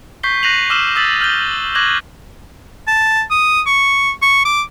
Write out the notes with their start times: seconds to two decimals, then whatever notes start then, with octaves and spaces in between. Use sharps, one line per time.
0.23 C#6 G6 B6 C7 G7
0.43 F#6 A#6 C7 D#7 F7 F#7
0.70 D6 E6 F6 E7 F#7 G7
0.95 D#6 E6 G6 A6 B6 F#7
1.21 F6 G6 G7
1.75 C#6 D6 F#6 G#6 A#6 F#7
2.88 A5
3.31 D#6
3.66 C#6
4.22 C#6
4.45 D6